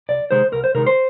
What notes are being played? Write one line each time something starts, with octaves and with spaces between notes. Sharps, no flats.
C2 D5
C3 D#3 G#3 C5
C2 A#4
C5
C3 D#3 G#3 A#4
C5